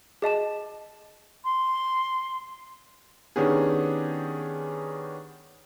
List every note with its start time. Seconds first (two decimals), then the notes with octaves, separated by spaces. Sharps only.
0.22 G#4 D#5 A5 E7
1.44 C6
3.36 D#3 B3 C#4 D4 G4 G#4